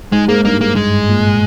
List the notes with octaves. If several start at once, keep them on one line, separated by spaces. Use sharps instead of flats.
G#2 G#3
G#2 A#3
G2 A#3
G#2 A#3
G#3
A#2